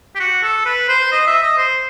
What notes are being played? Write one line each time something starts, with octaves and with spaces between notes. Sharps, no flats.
G4
F#4
A4
B4
C5
D#5
E5
D#5
C5